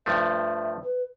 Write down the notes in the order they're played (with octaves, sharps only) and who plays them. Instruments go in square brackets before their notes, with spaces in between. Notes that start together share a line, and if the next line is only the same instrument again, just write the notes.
[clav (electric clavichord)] G2 F3 A3 [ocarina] E5
[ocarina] B4